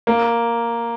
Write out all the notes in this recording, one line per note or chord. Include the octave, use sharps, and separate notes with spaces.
A#3